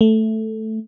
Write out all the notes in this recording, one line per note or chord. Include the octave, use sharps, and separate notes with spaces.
A3